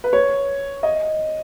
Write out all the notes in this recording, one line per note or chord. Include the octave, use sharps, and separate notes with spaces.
B4
C#5
D#5